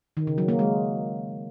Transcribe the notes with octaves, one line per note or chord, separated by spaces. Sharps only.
D#3
C#3
F#3
A#3
G#3